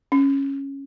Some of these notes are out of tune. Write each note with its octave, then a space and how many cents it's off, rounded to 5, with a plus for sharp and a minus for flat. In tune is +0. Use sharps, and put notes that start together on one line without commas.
C#4 -10